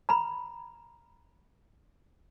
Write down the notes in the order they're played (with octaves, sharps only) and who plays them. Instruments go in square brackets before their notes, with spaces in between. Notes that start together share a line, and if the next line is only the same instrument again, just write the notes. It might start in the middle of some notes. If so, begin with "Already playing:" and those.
[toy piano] A#5 B5